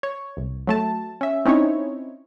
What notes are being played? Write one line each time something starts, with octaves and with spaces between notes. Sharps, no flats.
C#5
C2
F#3 A3 A5
C#4 E5
C4 C#4 D#4 E4 C#5